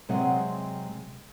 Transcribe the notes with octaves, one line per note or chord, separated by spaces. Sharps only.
C3 F#3 G#3 C4 G#4 F#5